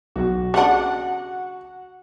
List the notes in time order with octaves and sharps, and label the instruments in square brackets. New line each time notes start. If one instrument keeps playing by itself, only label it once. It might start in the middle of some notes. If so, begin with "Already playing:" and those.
[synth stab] B1 [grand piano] F#4
[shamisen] C#3 D4 [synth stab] F#5